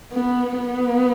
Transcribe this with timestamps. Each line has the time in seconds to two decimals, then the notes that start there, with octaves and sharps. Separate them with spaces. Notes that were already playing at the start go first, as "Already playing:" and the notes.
0.13 B3
0.57 B3